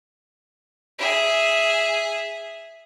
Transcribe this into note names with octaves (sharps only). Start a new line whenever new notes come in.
G#4 E5